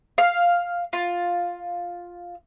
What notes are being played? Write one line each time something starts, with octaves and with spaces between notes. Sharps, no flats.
F5
F4